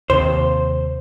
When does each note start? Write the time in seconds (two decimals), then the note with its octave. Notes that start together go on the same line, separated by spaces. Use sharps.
0.10 D#2 C3 C5